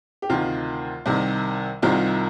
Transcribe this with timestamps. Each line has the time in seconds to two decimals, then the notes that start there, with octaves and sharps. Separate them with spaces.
0.22 G4
0.29 D2 C3 D#3 F4
1.06 C2 C3 D#3
1.82 C2 C3 D#3 F4